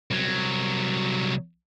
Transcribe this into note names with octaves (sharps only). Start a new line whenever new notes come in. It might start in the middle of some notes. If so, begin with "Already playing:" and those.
C2 F#3